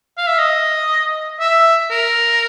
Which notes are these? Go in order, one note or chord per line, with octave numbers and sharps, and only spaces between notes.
F5
E5
D#5
E5
A#4